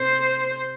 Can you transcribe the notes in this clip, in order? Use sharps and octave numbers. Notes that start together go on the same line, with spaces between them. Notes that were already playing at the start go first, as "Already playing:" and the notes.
Already playing: C3 C5